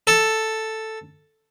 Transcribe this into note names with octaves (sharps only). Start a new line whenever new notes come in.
A4